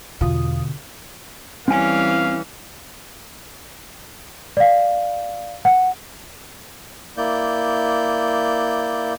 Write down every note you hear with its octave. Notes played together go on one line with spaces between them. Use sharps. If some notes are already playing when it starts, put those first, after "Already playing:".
E2 B2 D3 F4 D#6
E3 G3 C4 C#4 F5 G#5
D5 F5
F#5
A#3 E4 D5 G6